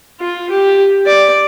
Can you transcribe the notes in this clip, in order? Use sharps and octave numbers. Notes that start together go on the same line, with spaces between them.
F4
G4
D5